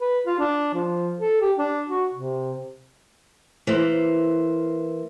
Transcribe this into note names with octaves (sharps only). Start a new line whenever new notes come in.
B4
F4
D4
F3
A4
G4
D4
F#4
C3
E3 A#3 C5